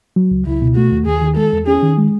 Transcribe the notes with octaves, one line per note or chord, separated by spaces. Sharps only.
F#3
C#2
C#2 E4
B2
A3 F#4
D#2
D#2 G#4
D#3
G#3 A4
E2
C#4 G#4
D#3
G#3